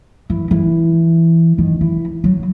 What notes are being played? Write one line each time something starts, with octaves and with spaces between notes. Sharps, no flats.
E3
E3
D#3
E3
F#3